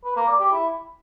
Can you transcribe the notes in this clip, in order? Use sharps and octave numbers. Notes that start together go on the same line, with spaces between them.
B4
A#3
D5
G4
E4